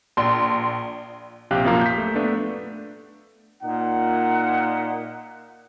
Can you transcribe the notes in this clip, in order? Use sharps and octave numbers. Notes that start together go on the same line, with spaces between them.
A#1 C6
A#1 C3 G4 F5 G5 F#6
F#2 A#2 F3 A#3 F5 A#5
G6 B6
A3
A3 B3 D4
A#2 D#4 F#5